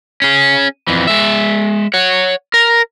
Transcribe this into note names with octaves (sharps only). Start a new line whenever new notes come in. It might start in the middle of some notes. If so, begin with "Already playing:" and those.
C#4 G#4
F2 E3
G#3 E5
C#5 F#5
A#4